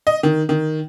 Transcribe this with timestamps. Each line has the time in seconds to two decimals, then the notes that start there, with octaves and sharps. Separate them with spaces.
0.07 D#5
0.23 D#3
0.49 D#3